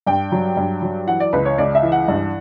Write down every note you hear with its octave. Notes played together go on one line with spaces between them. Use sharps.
G2 G5
F#3
G2
F#3
E3 F#5
D5
C#2 B4
C#5
C#2 D5
E5
E3
F#5
G2